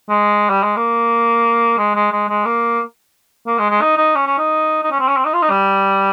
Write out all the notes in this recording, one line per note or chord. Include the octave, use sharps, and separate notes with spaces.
G#3
G3
G#3
A#3
G#3
G#3
G#3
G#3
A#3
A#3
G#3
G#3
D#4
D#4
C#4
C#4
D#4
D#4
C#4
C4
C#4
C4
D#4
F4
D#4
G3